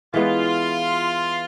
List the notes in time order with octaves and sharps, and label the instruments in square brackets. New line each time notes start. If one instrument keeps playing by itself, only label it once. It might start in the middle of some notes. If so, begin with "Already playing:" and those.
[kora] E3 G#3 B3 [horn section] F4